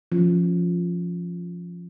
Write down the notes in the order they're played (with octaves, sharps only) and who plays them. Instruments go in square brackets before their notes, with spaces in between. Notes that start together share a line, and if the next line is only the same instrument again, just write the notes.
[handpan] F3 C#4